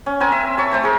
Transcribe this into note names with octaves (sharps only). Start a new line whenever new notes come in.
C#4
C4 A#4 G#5
E5
C#5 A5 C#6 E6
A3 C5 A#5
G#4 A#4